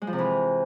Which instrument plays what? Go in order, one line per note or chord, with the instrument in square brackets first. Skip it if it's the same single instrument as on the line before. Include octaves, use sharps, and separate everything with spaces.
[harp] G#3
F3
C3
E3